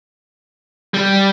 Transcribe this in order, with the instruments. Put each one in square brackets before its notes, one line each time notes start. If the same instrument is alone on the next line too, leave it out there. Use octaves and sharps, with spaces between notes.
[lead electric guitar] G3